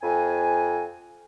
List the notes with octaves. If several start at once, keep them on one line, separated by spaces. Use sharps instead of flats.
F2 G#5